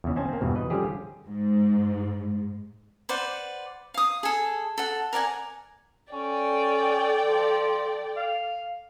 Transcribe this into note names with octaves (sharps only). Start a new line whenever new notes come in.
E2 C#3
C4 C#4 C5 D#5 G#5 A5
A#3 C4
E2 G2 B2
E3 B4 D#5
D3 F3 G3 C#4 G4 G#4
G#2
B4 C5 D5 F#5
F5 D#6
G#4 A4
A4 F#5
A#4 D5 F#5 G#5
C#4 A4 D5 G5
F3
F5